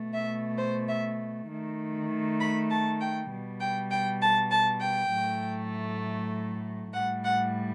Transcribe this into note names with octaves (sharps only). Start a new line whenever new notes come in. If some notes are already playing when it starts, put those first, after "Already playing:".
Already playing: B2 A3
E5
C5
E5
D#3 A3
B5
A5
G5
B2 G3
G5
G5
A5
A5
G5
A2 F#3 A3
A2 F#5
G3
F#5